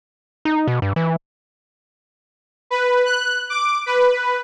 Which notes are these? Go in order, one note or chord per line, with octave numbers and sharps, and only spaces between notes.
D#4
B2
G2
E3
B4
F#6
D6
B4